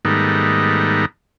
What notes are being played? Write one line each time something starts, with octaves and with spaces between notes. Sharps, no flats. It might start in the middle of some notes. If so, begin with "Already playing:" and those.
G#2 D#3 G3 A3 B3 D#4